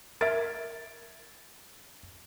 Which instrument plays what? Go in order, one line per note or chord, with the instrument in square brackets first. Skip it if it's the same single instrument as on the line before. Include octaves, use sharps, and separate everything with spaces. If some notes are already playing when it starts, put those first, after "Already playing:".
[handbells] A#4 E5 [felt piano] G#6 A6 D7